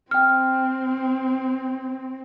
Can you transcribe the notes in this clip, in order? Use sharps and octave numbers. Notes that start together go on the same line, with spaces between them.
C4 G5 F6